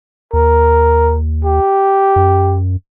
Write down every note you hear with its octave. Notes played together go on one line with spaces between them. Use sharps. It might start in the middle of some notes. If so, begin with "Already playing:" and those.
D#2 A#4
G4
F#2